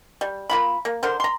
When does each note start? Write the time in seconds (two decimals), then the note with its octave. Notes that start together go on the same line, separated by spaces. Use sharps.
0.21 G3
0.49 A#3 F4 B5
0.85 A#3
1.03 D3 A#4 C5
1.20 A#5 C6